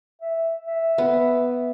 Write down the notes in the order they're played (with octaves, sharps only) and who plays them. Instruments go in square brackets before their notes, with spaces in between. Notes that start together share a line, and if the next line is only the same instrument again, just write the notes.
[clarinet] E5
E5
[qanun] B3